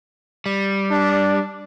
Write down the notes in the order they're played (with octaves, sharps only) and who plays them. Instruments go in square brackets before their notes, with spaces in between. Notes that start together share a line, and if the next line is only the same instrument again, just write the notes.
[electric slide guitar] G3
[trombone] D4